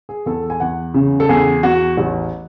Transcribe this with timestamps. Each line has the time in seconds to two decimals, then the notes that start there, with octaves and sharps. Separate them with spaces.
0.09 G#4
0.26 E2 A4
0.50 G#5
0.60 E2 F#5
0.94 C#3
1.20 A4
1.29 E2 G#4
1.63 E2 F#4
1.97 A1